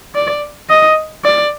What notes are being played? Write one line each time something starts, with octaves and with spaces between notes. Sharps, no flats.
D5
D#5
D5